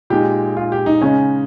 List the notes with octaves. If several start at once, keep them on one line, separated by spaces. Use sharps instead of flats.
A#2 G#3 D#4 G4
F4
G4
D#4
C#3 G#3 C#4 D#4